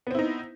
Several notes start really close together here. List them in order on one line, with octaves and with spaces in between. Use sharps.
B3 C4 E4 D#4